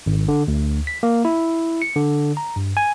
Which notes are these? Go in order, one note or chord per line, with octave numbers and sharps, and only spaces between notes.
G#1
D3
D2
B6
A#3
E4
C#7
D3
A#5
G2
G#5